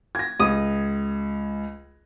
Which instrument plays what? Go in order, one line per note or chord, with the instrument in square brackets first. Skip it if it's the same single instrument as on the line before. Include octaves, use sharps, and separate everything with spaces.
[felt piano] G#6 A#6
[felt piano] C#2 [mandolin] D#6